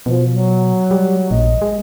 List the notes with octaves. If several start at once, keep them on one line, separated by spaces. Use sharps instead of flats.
B2 F3
F#3
G3
A#1 D#5
G#3